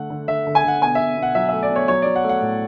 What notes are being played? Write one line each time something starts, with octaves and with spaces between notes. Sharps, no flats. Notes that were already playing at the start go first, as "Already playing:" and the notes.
Already playing: D3 A3 F#5
D3
D3 E5
D3
G#5
D3 F#5
B2 G#5
E5
B2
B2
F#5
F#3 E5
A3 E5
D5
B2 C#5
F#3 C#5
F#3 D5
F#5
A3
F#5
A2